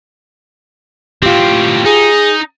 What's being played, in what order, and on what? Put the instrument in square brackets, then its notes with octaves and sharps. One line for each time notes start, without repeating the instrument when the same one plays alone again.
[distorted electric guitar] A2 C4 [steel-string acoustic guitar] F4 G4
[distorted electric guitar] D#4 [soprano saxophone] G#4